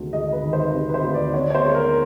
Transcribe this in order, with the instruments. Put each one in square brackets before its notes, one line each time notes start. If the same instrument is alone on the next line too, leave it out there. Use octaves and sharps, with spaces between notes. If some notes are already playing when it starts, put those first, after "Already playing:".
Already playing: [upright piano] D2 C3 D#3 G#3
G#3 D#5
B4
D#3
C5
C3
B4
C5
D2
D5
B3 C#5
C#5
C5
G#3
A#4